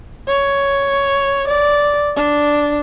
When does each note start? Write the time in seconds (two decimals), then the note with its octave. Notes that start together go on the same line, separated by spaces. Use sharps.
0.28 C#5
1.47 D5
2.16 D4